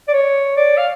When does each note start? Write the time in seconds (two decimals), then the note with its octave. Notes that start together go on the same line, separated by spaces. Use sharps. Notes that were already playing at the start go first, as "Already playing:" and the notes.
0.08 D5
0.13 C#5
0.57 D5
0.77 F5